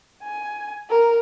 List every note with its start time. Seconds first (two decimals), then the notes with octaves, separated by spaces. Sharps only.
0.23 G#5
0.90 A#4